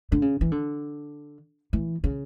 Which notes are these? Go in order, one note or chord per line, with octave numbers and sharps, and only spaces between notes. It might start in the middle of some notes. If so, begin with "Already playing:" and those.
D3
C#3
E3
D3
E3
C#3